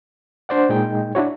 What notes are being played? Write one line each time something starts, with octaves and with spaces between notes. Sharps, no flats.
D4 C5 D5 F#5
A#2 G#3 D#4 G5
D4 E4 F#4 C#5